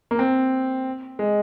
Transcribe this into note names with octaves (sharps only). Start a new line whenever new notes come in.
A#3
C4
G#3